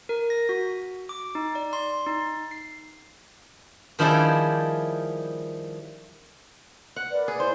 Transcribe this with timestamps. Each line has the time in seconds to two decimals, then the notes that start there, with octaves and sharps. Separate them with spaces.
0.09 A#4
0.30 A#6
0.49 F#4
1.09 D6
1.35 D#4
1.55 D5
1.73 C6
2.07 D#4
2.51 C7
3.99 D#3 F3 G3 E4 G#4 D5
6.96 F#5
7.11 A#4 B4 D5
7.28 G#4
7.40 E4 C5 C#5